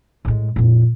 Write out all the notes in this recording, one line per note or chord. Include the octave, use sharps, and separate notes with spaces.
A2 G#3
F2 A#2